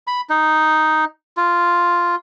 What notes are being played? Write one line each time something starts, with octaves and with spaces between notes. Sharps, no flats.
B5
D#4
F4